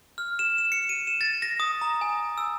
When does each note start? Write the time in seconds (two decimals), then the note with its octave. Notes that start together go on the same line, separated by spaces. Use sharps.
0.18 F6
0.39 E7
0.58 E7
0.72 C#7
0.89 D#7
1.07 E7
1.21 A6
1.42 A#6
1.60 D#6
1.81 A#5
2.01 G#5
2.38 E6